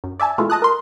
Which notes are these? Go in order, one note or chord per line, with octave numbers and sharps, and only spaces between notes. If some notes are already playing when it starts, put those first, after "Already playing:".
F#2
D5 E5 G#5 A5
B2 E3 G#3 A3 F4
D#5 A5 D#6 F#6
A#4 C6